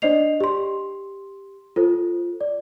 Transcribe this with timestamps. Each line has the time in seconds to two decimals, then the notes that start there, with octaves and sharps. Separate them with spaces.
0.02 D4 C5 D5 D#5 C7 F7
0.40 G4 C6
1.76 F4 A4 C5
2.41 D5